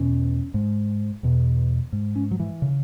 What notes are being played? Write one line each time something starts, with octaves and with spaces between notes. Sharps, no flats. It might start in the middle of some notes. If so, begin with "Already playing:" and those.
Already playing: E2 B2 C#4
G#2
E2 B2
G#2
C#4
F#3
E3
C#3